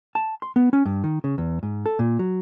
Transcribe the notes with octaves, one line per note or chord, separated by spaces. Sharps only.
A5
C6
B3
C#4
G2
D#3
C#3
E2
G#2
A4
A#2
F#3